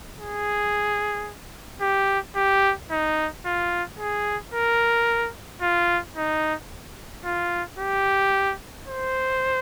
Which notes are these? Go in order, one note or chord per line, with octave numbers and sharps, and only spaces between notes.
G#4
G4
G4
D#4
F4
G#4
A#4
F4
D#4
F4
G4
C5